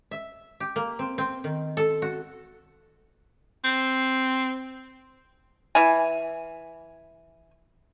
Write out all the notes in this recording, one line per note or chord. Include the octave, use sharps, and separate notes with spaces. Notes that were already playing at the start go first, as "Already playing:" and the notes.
E5
G4
A#3
C4
C4
D#3
A4
F#4
C4
E3 G#5